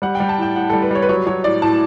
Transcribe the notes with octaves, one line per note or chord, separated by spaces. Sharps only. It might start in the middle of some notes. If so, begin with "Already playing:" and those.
G3 F#5
G5
G3
A5
A2 G5
A2 F#5
G3 A4
B4
G3 C#5
B4
F#3 C#5
F#3 C#5
A2 D5
A2 A5